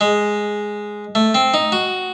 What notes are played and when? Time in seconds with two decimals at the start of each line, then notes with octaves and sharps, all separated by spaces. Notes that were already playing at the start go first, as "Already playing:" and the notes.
0.01 G#3
1.15 A3
1.35 C4
1.54 D#4
1.72 F#4